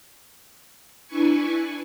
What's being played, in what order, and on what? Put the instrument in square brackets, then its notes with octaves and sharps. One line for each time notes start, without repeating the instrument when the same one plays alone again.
[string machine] D4 E4 B4 G#5 C#6